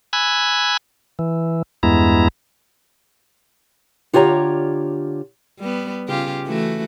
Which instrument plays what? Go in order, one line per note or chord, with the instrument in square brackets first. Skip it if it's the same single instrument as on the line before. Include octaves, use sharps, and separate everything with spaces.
[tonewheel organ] G#5 B5 E6 F#6 G#6
E3
E2 G2 G#3 B3 E4 A#5
[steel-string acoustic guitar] D3 F4 G4 C#5 F5 A#5
[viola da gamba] G3 B3
C#3 F4 G4
E3 A3 F#4